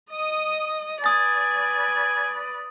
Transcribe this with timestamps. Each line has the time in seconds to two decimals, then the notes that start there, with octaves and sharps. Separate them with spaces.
0.12 D#5 D#6
1.04 B4 D5 G#5 D#6 A6